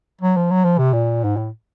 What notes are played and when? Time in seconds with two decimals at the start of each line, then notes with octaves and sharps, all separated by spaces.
0.21 F#3
0.36 F3
0.51 F#3
0.64 F3
0.78 C3
0.93 A#2
1.24 G#2
1.37 A2